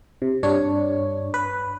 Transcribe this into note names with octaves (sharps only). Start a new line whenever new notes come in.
C3
G2 D4 C#5
B4